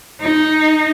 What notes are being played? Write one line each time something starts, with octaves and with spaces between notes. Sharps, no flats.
D#4